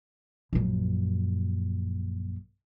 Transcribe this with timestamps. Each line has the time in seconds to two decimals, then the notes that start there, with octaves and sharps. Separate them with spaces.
0.53 A#1 F#2